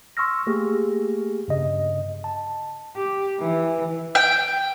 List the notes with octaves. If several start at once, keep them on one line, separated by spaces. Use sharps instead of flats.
C6 C#6 E6 F6 A#6
A3 A#3 G4 G#4
G2 C#3 D#5
A5
G4
E3
G5